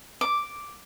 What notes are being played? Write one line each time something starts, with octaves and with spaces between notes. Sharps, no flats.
D6